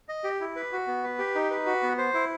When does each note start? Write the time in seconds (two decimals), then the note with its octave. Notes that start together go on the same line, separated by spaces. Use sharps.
0.09 D#5
0.24 G4
0.41 E4
0.56 B4
0.72 F#4
0.87 B3
1.04 B4
1.19 G4
1.35 D#4
1.51 B4
1.66 F#4
1.83 B3
1.98 C5
2.14 E4